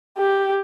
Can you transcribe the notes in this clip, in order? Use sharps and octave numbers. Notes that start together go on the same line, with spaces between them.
G4